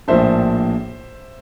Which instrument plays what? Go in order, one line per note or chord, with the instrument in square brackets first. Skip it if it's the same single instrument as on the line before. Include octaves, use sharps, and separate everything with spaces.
[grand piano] A#1 A2 F3 A#3 D4 C5 E5